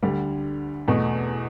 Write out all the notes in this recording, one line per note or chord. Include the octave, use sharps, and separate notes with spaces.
D2 D3 G3
E2 B2 A3